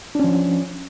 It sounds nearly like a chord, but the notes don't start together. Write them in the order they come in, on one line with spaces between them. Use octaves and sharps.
D4 C#4 F3